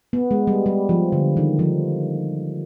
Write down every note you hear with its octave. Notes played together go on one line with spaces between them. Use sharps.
B3
G#3
G3
G3
F3
D3
D#3
F3